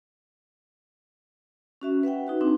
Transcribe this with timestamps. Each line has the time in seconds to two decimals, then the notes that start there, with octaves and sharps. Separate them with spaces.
1.81 C#4 F#4 E5
2.03 B4 E5 F#5 G5
2.27 D#4 F#4 B4
2.41 C4 D4 D#4